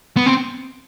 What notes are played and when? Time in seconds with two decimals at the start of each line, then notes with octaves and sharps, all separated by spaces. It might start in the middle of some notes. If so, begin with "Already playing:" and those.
0.17 B3
0.26 C4